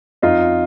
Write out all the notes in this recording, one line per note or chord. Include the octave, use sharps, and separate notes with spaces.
F2 D#4 F4